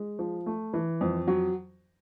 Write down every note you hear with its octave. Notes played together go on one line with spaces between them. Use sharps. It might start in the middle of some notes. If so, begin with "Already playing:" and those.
Already playing: G#3
F3
A3
E3
F2
F#3